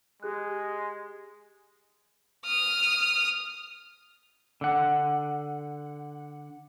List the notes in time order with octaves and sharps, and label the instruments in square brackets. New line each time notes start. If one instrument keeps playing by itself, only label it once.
[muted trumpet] G#3 [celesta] G4 G#4 F#6
[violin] D#6 F6
[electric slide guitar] D3 F#5